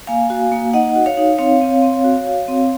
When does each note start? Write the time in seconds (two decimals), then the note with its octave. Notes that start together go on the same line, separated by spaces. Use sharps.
0.07 A#3 F5 G#5
0.30 F#4
0.52 A#3
0.73 D#4 D#5 F#5
0.96 F#4
1.06 C#5 F5
1.17 D#4
1.38 C4 C#5 F5
1.61 C4
1.82 C4
2.04 F#4
2.27 F#4
2.48 C4